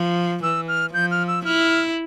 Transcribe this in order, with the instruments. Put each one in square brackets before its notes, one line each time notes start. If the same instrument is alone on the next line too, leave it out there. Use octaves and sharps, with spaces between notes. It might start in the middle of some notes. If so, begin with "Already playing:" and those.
Already playing: [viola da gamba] F3
[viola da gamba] E3 [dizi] E6
[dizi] F6
[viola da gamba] F3 [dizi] G6
[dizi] F6
E6
[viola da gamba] E4 [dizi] F6